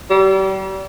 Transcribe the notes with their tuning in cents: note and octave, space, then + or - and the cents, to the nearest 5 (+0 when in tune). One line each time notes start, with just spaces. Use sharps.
G3 -35